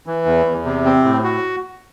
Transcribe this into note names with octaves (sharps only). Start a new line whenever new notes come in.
E3
E2
E2
C3
C4
A2
F#4